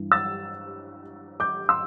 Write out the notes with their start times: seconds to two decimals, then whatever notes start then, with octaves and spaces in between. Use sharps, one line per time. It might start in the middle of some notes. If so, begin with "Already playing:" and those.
Already playing: G2 E3 G3
0.12 E6 A6
1.40 D6 G6
1.69 C6 E6